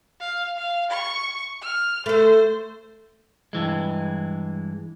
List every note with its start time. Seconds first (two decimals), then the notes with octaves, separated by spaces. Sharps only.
0.20 F5
0.57 F5
0.90 C#6
1.62 F6
2.06 A3 A4 C5
3.53 G2 E3 G#3